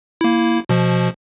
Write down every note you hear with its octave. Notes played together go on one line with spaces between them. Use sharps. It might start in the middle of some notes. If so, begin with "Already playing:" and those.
A#3 E4
B2 F3